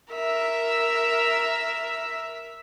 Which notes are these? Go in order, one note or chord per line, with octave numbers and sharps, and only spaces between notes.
A#4 E5